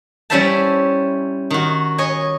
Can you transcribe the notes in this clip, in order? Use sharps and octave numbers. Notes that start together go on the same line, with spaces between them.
G3 C#4 E4 C5 E5 A5
D#3 F#4
C#5 D#5 G#5